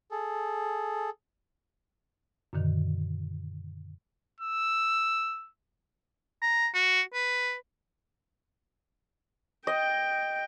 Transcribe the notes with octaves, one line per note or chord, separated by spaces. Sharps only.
G#4 A4
F#2 A#2 D3 D#3
E6
A#5
F#4
B4
D#5 G5